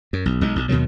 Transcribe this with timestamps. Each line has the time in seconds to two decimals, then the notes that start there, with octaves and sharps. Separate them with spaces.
0.13 F#2
0.26 B1
0.41 B1 G#3
0.56 B1
0.69 D#2 B2 D#3 F#3